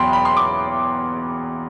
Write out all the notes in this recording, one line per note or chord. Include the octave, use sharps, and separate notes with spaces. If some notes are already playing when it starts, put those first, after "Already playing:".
Already playing: E2 B2 F#3 B3 G5 B5 C6
B5
C6
D6